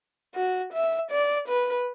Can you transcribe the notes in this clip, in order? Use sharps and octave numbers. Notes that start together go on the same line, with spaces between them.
F#4
E5
D5
B4